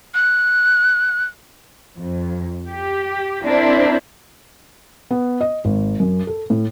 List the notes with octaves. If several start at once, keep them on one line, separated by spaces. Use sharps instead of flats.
F#6
F2
G4
C4 D4 E4 A#4 C5
B3
D#5
G#1
F#2
A4
A2